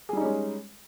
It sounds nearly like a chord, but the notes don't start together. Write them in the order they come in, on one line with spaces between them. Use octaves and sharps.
G#4 G3 D#4 C#4 G#3